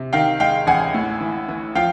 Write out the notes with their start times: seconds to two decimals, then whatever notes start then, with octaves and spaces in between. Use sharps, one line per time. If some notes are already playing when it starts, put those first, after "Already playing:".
Already playing: C3
0.13 D#3 F5 G5
0.40 G#3 F5 G5
0.67 A1 F#5 G#5
0.94 A2
1.21 E3
1.48 E3
1.75 F3 F5 G5